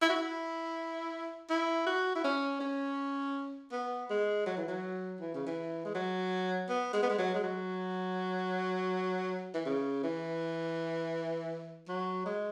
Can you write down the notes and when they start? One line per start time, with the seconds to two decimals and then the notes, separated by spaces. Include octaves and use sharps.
0.02 E4
0.09 F#4
0.16 E4
1.50 E4
1.87 F#4
2.15 E4
2.24 C#4
2.60 C#4
3.72 B3
4.10 G#3
4.46 F#3
4.57 E3
4.68 F#3
5.20 E3
5.34 C#3
5.47 E3
5.85 G#3
5.95 F#3
6.69 B3
6.93 G#3
7.03 B3
7.10 G#3
7.19 F#3
7.34 G#3
7.43 F#3
9.54 E3
9.66 C#3
10.03 E3
11.88 F#3
12.26 G#3